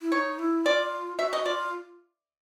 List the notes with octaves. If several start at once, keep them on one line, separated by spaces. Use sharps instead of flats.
E4
D#4 C#5
E4
F4 D5
F#4 E5
D#5
F4 D5